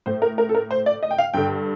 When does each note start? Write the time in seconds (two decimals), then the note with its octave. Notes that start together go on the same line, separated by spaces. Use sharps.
0.06 A2 C5
0.22 A#4
0.38 A#4
0.49 A4
0.55 A#4
0.71 C5
0.86 D5
1.03 D#5
1.11 G5
1.18 F5
1.34 G2 D3 G5